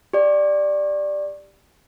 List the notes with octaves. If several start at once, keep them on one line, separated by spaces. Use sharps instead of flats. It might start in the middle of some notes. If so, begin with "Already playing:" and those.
G4 D5